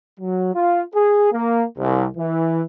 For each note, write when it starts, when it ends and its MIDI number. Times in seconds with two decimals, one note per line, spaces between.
0.20 0.54 54
0.54 0.81 65
0.95 1.28 68
1.32 1.64 58
1.78 2.07 36
2.17 2.62 52